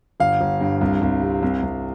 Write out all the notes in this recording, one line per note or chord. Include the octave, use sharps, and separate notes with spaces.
G1 F5
G1
G2
C2
C2
C3
C2
C2